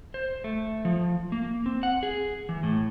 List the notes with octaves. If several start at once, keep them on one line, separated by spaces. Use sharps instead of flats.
C5
A3
F3
A#3
C4
F#5
G#4
E3
A2